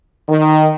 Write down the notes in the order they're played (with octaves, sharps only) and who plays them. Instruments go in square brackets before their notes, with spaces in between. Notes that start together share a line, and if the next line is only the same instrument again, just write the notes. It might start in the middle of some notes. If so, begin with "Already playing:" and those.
[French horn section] D#3